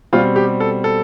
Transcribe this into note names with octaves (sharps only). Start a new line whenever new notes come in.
B2 G3 C4 F4
G4
A4
A4